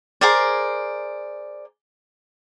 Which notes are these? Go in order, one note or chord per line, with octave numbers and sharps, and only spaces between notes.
G#4 A#4 C5 D5